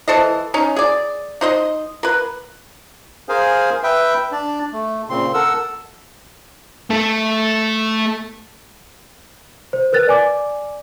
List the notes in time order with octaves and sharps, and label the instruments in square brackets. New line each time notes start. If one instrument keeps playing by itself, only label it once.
[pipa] E3 A4 C5 D#5
C#4 D#4
G#4 D5
D#4 C5 D#5
A#4 B4
[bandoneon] G#4 A#4 C5 F5 G#5
B4 E5 G5
D4 D5
A3
A#2 C#3 C4 C6
A4 A#4 F#5 E6
[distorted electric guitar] A3 A4
[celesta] C5
A#4 B4 F#6 A6
D5 G#5 D6